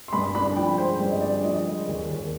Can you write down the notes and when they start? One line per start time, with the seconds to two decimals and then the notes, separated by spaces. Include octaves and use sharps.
0.08 C6
0.13 G2 B5
0.35 D4 B5
0.56 F3 G5
0.78 G#3 C5
1.00 G2 D5
1.11 D#5
1.22 D4 D5
1.44 F3 D#5
1.66 G#3
1.87 D#2
2.09 D#2